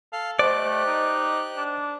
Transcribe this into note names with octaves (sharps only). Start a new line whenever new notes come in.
A4 F5
A3 G4 C5 D5 D#5 F#6
A3
D#4
D4